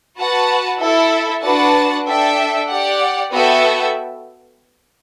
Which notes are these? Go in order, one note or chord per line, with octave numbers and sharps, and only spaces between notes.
F#4 B4 F#5 A5
E4 A4 E5
D4 F#4 B4 F#5 A5
D4 A4 E5 G5
G4 D5 F#5
B3 F#4 A4 E5 G5